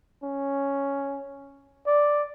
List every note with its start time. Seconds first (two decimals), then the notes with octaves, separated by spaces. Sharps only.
0.24 C#4
1.87 D5